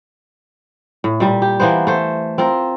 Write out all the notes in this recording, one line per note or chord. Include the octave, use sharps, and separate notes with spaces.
A2
A#2 G3
G4
E3 A#3 B3 C5
A3 C5
C4 F4 A#4